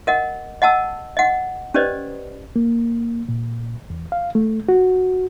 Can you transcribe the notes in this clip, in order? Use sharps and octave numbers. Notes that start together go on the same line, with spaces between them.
A#4 D#5 F#5
D#5 F#5 A5 E6
D#5 F#5
C#4 G4 B4 C5 D5 D#5
A#3
A#2
E2
F5
A3
F#4